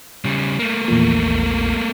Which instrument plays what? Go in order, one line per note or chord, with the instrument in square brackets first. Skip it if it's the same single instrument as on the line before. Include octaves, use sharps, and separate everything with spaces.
[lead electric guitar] C#3 G3
A3 A#3
[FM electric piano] A#1 E2 A#2